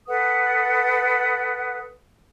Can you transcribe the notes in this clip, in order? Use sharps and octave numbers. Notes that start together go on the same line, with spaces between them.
A4 B4 F#5 D#6